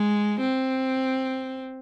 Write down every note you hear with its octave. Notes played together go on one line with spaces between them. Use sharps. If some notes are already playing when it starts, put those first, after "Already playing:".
Already playing: G#3
C4